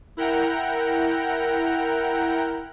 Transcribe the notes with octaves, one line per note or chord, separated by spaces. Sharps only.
E4 A#4 F#5 G5 A#5